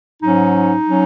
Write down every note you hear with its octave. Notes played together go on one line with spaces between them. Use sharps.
G#2 F#3 C#4 D#4
F#3 C#4